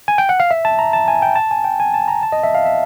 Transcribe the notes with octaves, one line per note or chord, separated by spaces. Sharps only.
G#5
G5
F#5
F5
E5
A5
A#5
A5
G#5
G5
A5
G#5
G5
G#5
A5
A#5
A5
D#5
E5
F5
E5